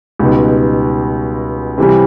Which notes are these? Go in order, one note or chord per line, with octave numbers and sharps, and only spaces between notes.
C#2 B2 G3 B3 D#4
C3 E3 G3